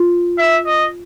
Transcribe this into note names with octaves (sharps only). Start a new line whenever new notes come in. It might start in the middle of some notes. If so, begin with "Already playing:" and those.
Already playing: F4
E5
D#5